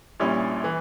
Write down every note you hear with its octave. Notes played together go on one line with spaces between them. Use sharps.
A#1 A#2 G3 C#4 E4
E3